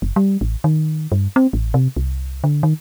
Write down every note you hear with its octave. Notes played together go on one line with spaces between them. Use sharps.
F#1
G3
A1
D#3
G2
C4
A1
C3
C2
D3
D#3